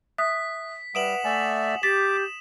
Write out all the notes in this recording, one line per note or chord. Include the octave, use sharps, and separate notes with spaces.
E5 D#6 F#6 B6
G3 B4 E5 F#5 D#6 D7 E7 F#7
A3 D5 E5 G#5
G4 D6 A6 B6 E7